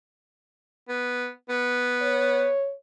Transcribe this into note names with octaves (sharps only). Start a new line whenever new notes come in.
B3
B3
C#5